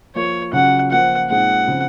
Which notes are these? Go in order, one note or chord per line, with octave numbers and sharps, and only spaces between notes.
F3 A#3 F4 C#5
C#3 F#3 C#4 F4 F#5
F3 A#3 F4 C5 F#5
A#2 G#3 C4 D#4 G#4 F#5
C#3 F3 C4